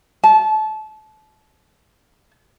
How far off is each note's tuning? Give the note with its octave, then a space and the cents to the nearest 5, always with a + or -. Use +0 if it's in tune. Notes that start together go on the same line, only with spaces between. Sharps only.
A5 -25